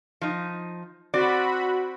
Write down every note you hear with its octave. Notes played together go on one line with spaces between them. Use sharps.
F3 D#4
C4 F#4 D5 B5